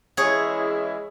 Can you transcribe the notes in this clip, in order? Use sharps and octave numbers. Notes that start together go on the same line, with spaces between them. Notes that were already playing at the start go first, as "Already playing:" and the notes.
E3 G#3 C#4 E4 G#4 C#5